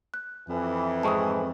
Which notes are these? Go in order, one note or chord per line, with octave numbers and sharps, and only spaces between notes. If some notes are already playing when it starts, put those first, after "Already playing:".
F#6
F2 E3
G#2 G#3 C4 A5 C#6 D#6